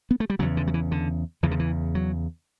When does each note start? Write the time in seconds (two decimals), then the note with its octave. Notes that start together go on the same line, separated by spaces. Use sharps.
0.11 B3
0.20 A3
0.30 G3
0.39 C#3 F#3
0.42 E2
0.57 D3
0.67 F#3
0.74 E3
0.91 D3
1.43 E2 C#3 E3
1.51 D3
1.59 E3
1.95 F#3